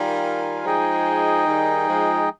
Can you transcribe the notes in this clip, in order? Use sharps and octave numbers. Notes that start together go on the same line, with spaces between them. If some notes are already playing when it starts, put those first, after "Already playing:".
Already playing: D#3 G3 F4 A#4 F5 G#5
F3 G#3 D#4 G#4 D#5 G5
D#3 G3
F3 G#3